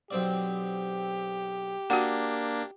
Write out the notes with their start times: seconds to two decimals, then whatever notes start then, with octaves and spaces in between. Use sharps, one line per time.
0.11 B1 C4 G4 D5
1.90 A#3 D4 F#4 F#5